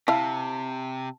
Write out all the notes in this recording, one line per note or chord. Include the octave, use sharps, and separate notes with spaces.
C3 E4 F5 A5